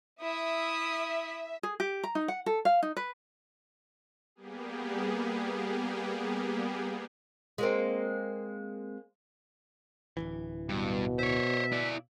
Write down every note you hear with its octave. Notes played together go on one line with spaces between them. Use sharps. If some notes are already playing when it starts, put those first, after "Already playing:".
E4 E5 D#6
G#4
G4
A#5
D#4
F#5
A4
F5
D#4
B4
G3 A#3 B3 G4 G#4
G#3 A#3 C4
D1 C2 E3
G2 B2
C5 C#5 E5
E4 D5